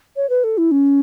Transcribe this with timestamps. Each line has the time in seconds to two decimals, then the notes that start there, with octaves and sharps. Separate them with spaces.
0.16 C#5
0.30 B4
0.44 A4
0.58 E4
0.71 C#4